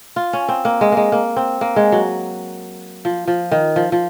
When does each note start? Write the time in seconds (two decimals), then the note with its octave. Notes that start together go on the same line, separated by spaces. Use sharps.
0.16 F4
0.33 C#4
0.48 C4
0.65 A#3
0.81 G#3
0.92 G#3 A#3
1.12 A#3
1.36 C4
1.61 A#3
1.76 G#3
1.92 F#3
3.05 F3
3.28 F3
3.51 D#3
3.76 F3
3.92 F3